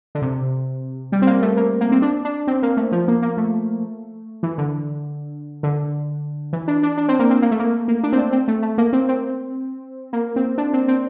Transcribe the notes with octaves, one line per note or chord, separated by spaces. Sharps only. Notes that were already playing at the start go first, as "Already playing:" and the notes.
D3
C3
G3
C4
A#3
A3
A#3
A#3
C4
D4
D4
C4
A#3
A3
F3
A#3
A#3
A3
E3
D3
D3
E3
D4
D4
D4
C4
A#3
C4
A#3
A3
A#3
A#3
D4
C4
D4
C4
A3
A3
A#3
C4
C4
A#3
C4
D4
C4
C4